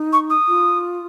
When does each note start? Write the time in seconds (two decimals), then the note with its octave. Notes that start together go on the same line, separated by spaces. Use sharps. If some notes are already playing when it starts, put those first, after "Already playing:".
Already playing: D#4
0.12 C#6
0.30 D#6
0.48 F4